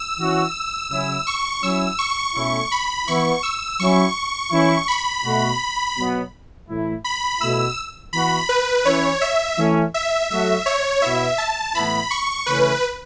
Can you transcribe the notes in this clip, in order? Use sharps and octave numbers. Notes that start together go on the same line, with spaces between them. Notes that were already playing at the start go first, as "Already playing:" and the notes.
Already playing: E6
E3 C#4 F#4
C#3 F#3 C#4 E4 E6
C#6
F#3 C#4 E4 E6
C#6
B2 A3 C#4 E4 C#6
B5
E3 B3 E4 C#6
E6
F#3 C#4 E4 C#6
E3 C#4 E4
B5
B2 A3 F#4
B2 F#3 B3
A2 E3 A3 E4
B5
B2 A3 E4 E6
E3 B3 F#4 B5
B4
E3 C#4 E4 C#5
E5
E3 A3 C#4
E5
F#3 A3 F#4 E5
C#5
B2 B3 E4 E5
A5
A2 E3 B3 E4 B5
C#6
C#3 E3 A3 C#4 B4